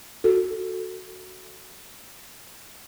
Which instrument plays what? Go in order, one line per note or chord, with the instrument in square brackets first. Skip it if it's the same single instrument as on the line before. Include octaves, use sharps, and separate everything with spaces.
[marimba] F#4 A4